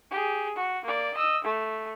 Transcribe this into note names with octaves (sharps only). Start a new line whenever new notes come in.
G4 G#4
F#4
A#3 D5
D#5 E6
A3